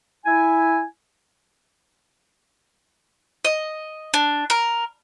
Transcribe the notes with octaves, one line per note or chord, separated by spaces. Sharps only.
E4 G#5
D#5
D4
A#4